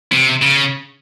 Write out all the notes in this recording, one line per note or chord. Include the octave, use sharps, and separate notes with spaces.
C3
C#3